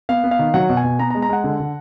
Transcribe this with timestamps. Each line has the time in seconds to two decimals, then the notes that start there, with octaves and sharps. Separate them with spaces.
0.09 B3 F5
0.24 B3
0.31 F5
0.39 D#3
0.54 F#3 F#5
0.69 B2
0.77 G#5
0.84 B2
0.99 B3 A#5
1.10 A#5
1.15 G#3
1.22 A#5
1.29 G#3 F#5
1.44 D3
1.60 D3